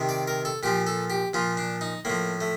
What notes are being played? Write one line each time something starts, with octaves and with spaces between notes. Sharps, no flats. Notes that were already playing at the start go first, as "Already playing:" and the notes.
Already playing: C3 D#3
D5
A#4
A4
A#2 F3 G4
A4
G4
A#2 F3 F4
D4
D#4
A2 F3 A#3
A3